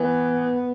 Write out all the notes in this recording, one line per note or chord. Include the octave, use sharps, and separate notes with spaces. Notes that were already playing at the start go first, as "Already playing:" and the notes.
Already playing: E3 B3